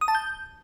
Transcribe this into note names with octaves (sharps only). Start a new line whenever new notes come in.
D#6
A5
G6